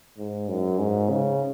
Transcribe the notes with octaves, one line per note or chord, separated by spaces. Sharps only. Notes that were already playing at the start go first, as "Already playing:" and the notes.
G#2
F#2
G#2
C#3